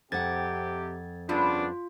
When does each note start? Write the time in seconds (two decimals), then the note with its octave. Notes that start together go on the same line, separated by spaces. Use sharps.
0.12 F2 C3 G4 F#5 G#6 A6
1.29 G2 C#3 B3 D4 F4